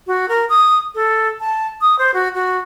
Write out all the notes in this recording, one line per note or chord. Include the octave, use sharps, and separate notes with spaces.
F#4
A#4
D#6
A4
A5
D#6
C5
F#4
F#4